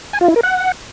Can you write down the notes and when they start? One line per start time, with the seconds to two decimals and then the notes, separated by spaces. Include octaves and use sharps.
0.13 G#5
0.21 F4
0.28 E4
0.36 A#4
0.43 F#5